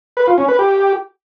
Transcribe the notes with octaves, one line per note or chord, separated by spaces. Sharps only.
B4
F4
C#4
B4
G4